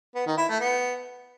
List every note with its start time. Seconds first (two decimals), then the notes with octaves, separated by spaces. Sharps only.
0.15 B3
0.26 D#3
0.37 E4
0.48 A3
0.60 B3